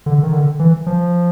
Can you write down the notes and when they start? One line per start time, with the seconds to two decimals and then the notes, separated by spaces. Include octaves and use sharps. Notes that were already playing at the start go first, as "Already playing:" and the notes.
0.06 D3
0.23 D#3
0.33 D3
0.59 E3
0.86 F3